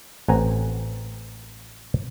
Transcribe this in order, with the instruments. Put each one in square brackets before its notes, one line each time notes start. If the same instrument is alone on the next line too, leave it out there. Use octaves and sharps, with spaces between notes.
[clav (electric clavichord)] A1 C4 F#5 G#5 A#5